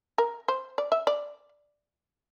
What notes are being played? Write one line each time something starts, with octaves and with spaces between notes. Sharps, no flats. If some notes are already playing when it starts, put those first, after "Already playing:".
A#4
C5
D5
E5
D5